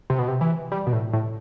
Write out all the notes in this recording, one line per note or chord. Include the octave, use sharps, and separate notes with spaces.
C3
B2
C3
E3
G3
B2
A2
A2